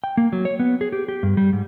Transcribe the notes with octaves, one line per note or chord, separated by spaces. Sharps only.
G5
A#3
F#3
C#5
B3
G#4
G4
G4
G2
G3
G#2